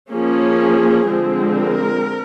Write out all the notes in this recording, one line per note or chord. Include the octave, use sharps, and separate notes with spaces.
F3 A#3 C#4 G#4
D3 F3 G#3 C4
A#4